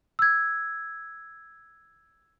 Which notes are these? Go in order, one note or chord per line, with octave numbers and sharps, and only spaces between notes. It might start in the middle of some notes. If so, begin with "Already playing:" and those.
E6 G#6